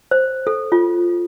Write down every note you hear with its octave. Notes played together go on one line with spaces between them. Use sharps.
C5
A4
F4